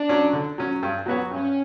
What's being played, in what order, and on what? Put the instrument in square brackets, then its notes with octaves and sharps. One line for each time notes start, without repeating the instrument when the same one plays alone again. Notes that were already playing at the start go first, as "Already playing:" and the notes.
Already playing: [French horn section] D4
[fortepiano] F#3 C#4
D3
F#3 C#4
G2
F#3 B3 F#4 C#5
[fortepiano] G2 [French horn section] C#4